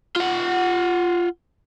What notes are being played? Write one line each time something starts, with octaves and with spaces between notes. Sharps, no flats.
F4 F#5